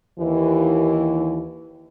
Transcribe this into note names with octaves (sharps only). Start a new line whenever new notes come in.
D#2 E3